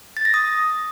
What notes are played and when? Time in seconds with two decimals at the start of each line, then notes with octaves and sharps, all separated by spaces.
0.17 A6
0.25 A#6
0.34 D#6